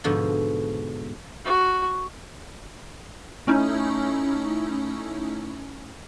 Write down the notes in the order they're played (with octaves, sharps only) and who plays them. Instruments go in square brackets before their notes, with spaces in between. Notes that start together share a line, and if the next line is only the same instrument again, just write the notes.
[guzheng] G#2 B2 D3 F3
[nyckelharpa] F#4
[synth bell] A3 C#4 D#4 E4